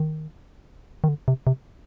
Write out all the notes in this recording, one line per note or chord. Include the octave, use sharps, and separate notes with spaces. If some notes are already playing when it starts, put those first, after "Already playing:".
Already playing: D#3
D#3
D3
C3
C3